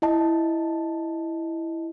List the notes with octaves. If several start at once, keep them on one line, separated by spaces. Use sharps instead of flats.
E4 D#5 A5